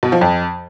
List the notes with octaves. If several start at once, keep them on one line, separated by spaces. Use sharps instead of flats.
B2
F3
F2